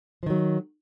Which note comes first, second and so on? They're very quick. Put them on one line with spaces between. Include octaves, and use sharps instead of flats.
F3 D#3 F#3